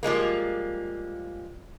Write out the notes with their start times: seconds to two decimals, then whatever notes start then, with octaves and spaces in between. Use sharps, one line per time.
0.03 F3 G3 G#3 A#3